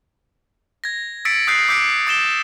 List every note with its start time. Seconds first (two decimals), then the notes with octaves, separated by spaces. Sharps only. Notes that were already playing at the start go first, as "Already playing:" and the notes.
0.84 G#6 A#6
1.25 E6 A6 B6 C#7 D7
1.47 D#6 E6 F#6 G6 B6 C7
1.69 D6 E6 G6 B6 C#7 D7
2.07 D6 A6 E7 G7